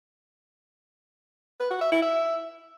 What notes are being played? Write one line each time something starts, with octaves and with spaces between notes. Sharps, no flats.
B4
F#4
E5
E4
E5